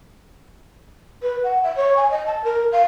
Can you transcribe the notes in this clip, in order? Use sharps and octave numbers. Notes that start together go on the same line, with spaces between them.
B4
F#5
E5
C#5
G#5
D#5
A5
A#4
F5